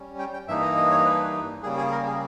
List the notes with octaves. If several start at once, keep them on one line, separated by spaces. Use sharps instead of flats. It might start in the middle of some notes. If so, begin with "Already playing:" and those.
Already playing: G3 C#4
G5
G5
G2 E3 A#3 D#4 E5
D#5
D#5
C#5
B4
C#3 G3 A#3 G#4
G#4
A#4
G#4